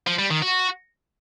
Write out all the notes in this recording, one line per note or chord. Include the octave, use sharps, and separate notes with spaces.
F3
G3
D#3
F#4